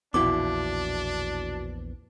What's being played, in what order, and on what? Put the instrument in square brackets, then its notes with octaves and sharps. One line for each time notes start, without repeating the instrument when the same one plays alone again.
[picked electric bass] A#1 E2 [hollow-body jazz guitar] B2 E4 [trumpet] D4 [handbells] D6